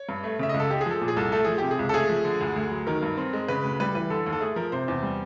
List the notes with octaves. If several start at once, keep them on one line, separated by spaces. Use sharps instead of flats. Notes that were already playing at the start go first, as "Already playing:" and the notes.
Already playing: C#5
G2
A3
C#3 E5
D#5
C#2
A4
G#3 G4
G#4
F3 A4
A#2
G#4
C2 A4
A3 A4
F3 G#4
C3 G4
G#4
C#2
A4
A3 G#4
F3
D3
D2
D2
F#3
D#3 A#4
G2
C4
G#3
C#3 B4
D2
G3 B4
E3 B4
D3 A4
D#2
A4
A3 G#4
F3 A#4
C3 C5
E2
G3